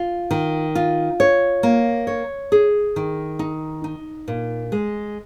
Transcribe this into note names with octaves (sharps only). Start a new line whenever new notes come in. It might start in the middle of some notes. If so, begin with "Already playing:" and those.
Already playing: F4
D#3
F4
C#5
A#3
C#5
G#4
D#3
D#4
D#4
A#2
G#3